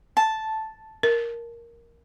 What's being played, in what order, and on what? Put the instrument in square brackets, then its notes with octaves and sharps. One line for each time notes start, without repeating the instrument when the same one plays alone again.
[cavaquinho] A5
[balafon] A#4